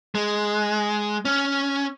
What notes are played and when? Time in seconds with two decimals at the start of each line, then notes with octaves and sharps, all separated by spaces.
0.15 G#3
1.25 C#4